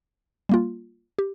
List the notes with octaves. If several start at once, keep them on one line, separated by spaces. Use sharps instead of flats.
G3 A#3 F4
G4